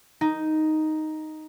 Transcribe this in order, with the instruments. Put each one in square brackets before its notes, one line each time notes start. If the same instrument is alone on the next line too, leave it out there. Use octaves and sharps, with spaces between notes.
[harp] D#4